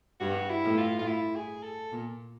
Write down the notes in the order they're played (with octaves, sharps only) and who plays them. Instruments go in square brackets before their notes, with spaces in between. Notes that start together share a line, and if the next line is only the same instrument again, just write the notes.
[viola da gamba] G2 [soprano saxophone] F#4
[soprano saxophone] E4
[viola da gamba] A2
[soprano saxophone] F4
F4
E4
G#4
A4
[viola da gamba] A#2